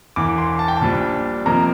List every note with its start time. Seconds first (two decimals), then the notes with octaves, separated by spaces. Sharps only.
0.16 E1 E2 E3 D6
0.38 C6
0.59 A5
0.68 G5
0.77 A5
0.82 A#1 A#2 G3 D4
1.46 F2 C3 F3 A#3 A#5